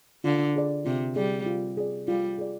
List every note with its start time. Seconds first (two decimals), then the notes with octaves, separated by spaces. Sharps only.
0.24 D3 F4
0.56 G#4 D5
0.85 C3 F4
1.16 G3 G#4 D5
1.46 F4
1.77 G#4 D5
2.08 G3 F4
2.38 G#4 D5